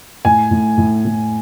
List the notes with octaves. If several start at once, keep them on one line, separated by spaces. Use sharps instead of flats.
A2 G#5
A2
A2
A2